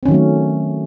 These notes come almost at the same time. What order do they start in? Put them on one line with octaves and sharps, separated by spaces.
C4 C#4 D#3 F#3 A3